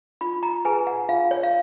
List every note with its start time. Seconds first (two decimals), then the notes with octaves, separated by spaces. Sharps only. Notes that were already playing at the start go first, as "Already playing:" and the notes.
0.21 F4 B5
0.43 A#5
0.65 G#4 B4 G#5
0.87 F#5
1.09 F4 F5
1.31 C#5
1.43 F5